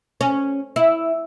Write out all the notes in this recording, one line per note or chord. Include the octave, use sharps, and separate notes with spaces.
C#4
E4